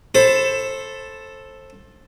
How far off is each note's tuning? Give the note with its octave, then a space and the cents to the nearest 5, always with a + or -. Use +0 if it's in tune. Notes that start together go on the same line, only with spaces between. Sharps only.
A4 +0 C5 +25 B5 +35